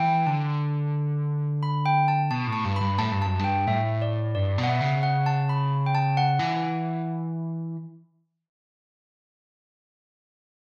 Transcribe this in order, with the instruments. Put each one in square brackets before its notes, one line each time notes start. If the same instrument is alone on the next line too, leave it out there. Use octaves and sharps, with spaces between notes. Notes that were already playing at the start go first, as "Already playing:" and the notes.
Already playing: [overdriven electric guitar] E3 [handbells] G5
[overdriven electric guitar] D3 [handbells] A5
[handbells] B5
G5
A5
[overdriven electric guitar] B2 [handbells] A5
[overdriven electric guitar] A2
[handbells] A5
[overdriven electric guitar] G2
[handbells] B5
[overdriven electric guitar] G2
[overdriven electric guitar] A2 [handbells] A5
[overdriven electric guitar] G2
[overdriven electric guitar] F#2 [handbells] A5
[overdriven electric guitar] G2 [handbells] G5
[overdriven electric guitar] A2 [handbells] E5
[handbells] D5
[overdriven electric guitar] G2 [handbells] D5
[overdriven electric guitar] B2
[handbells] F#5
E5
[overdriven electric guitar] C#3
[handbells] F#5
A5
B5
G5
A5
F#5
[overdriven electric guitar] E3